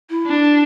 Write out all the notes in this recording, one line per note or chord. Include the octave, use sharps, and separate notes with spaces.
E4
D4